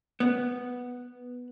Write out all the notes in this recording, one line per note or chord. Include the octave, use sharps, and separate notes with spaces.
B3